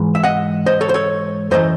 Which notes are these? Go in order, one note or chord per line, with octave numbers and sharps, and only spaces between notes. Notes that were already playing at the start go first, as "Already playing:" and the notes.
Already playing: G#2 E3
E5
D#5 F#5
C5 D#5
A4 C#5
C5
A4 C#5
F#2 E3 A3 C5 D#5